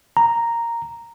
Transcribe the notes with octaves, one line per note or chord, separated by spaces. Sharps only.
A#5